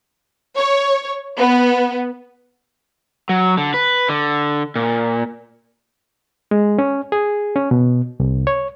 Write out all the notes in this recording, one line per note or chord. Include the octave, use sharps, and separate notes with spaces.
C#5
B3
F#3
D3
B4
D3
A#2
G#3
C#4
G#4
C#4
B2
C2
C#5